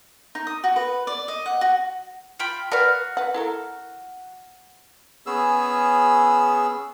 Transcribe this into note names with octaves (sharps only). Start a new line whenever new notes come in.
D#4
D#6
F#4
B4
D5
D#5
F#5
F#4
F4 G5 B5
F#4 A#4 B4 D5 F5
B4 F#5
E4 A4 A#4
B3 C#4 G#4 E6